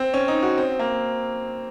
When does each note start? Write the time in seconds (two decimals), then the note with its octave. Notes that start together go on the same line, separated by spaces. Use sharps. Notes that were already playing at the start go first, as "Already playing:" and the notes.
Already playing: C4
0.14 C#4
0.28 D#4
0.43 F#4
0.58 C4
0.79 A#3